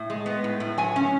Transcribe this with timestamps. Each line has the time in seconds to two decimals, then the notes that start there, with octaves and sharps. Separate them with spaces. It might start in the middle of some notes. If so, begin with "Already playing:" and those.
Already playing: A2
0.10 G#3
0.26 B3
0.44 A2
0.60 A2
0.78 F#3 G#5
0.96 C#4